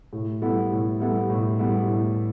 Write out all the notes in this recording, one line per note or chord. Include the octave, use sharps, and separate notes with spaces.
A2
G3 B3 E4 A4
A2
G3 B3 E4 A4
A2
G3 B3 E4 A4
A2